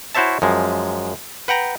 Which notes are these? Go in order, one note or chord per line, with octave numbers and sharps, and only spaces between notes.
E4 F#4 C5 C#5 E5 A5
F#2 F3 G#3
B4 F#5 G5 A#5